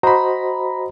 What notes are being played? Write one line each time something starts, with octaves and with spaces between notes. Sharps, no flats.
F#4 C5 D#5 A#5 B5